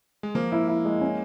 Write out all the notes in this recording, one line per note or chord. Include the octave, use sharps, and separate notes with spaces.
G#3
F3 A#3
E4
E4
G#3
C#4